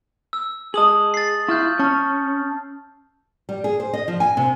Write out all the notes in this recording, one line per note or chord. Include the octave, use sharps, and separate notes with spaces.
E6
G#4 D#5 A5 D#6 F#7
A6 C7
E4 F4 C#6 F6 G6
C#4 A5 C#6
G3
G#4
C5
D#5
F3
G#5
C3